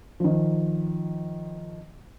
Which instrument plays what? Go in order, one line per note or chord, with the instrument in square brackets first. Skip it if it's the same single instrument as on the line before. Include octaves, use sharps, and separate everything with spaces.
[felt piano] D#3 F3